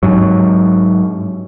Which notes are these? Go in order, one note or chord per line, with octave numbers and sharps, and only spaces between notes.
G#2 F#3